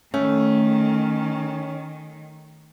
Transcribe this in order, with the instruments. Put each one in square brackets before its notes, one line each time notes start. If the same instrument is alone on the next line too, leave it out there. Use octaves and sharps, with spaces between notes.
[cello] D#3 [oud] A3 [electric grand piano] C#4